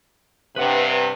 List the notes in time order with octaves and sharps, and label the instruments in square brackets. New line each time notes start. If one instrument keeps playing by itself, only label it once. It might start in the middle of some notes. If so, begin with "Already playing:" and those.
[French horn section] G2 C3 [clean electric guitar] B4 F#5